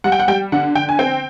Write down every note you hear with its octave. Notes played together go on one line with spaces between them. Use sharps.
G3 F#5
G5
F#5
G3 G5
D3 F#5
D3 G5
G#5
C4 G5